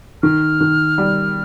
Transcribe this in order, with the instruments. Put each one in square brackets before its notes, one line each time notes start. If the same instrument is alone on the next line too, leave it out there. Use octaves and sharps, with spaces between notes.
[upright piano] D#3 [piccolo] F6
[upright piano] D#3
G3